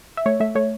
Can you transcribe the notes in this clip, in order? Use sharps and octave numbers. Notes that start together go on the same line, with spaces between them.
E5
A3 C#5
A3 E5
A3 C#5